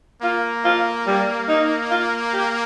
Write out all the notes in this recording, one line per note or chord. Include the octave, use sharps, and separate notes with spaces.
A#3 F4
F4
G3
D#4
F4
G4